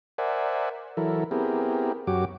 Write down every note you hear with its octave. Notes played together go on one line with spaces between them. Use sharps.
A#4 C5 D5 E5 F#5 G#5
E3 F#3 E4 A4 A#4
B3 C4 E4 G4 G#4 A#4
F#2 F#3 F#4 G4 D6